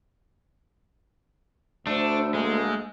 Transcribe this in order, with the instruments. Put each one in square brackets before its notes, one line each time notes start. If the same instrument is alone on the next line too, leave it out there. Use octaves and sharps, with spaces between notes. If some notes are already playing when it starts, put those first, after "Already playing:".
[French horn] D2 [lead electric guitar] A3 [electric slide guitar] D4 [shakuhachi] C5
[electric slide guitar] G#3 [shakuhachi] A#3